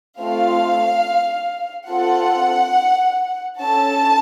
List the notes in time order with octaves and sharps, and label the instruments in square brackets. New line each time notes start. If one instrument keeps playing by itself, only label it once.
[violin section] A3 C4 F4 A4 F5
C4 F4 A4 F#5
C#4 A4 A5